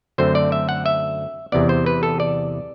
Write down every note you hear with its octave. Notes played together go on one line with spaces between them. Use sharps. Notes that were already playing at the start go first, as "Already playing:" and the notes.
F#2 D3 F#3 A3 C4 C5
D5
E5
F#5
E5
E2 C3 E3 B3 D5
C5
B4
A4
D5